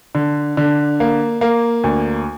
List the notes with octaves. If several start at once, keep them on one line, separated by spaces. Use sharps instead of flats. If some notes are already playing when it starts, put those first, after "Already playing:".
D3
D3
A#3
A#3
D2